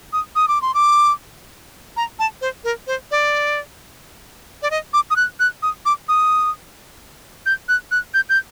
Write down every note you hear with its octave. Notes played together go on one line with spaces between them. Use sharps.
D#6
D#6
D6
C6
D6
A#5
A5
C5
A#4
C5
D5
D5
D#5
D6
D#6
F#6
F#6
D#6
D6
D#6
G6
F#6
F#6
G6
G6